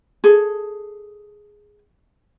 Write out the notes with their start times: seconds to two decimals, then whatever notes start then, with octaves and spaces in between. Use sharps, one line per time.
0.24 G#4 A4